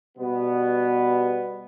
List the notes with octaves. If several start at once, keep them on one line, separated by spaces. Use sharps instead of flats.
B2 G3 B3